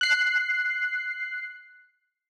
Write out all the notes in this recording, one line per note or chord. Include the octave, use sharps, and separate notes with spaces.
F#6 C7